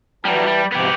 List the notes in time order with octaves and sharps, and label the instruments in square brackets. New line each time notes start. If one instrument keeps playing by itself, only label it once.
[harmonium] E3 A5 [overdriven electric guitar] F#3 G3
[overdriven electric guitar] G3
[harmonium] G#2 C3 F3 [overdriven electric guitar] B3 G4